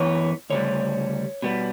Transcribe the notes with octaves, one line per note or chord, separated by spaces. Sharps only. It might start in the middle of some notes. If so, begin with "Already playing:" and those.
Already playing: F#2 E3 B3 C#5
D2 C#3 G3 C#5
B2 G3 B3